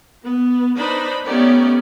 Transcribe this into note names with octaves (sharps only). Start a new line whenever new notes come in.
B3
D4 D#4 B4 C5 B5
A3 B3 C#4 D#4 G4 D5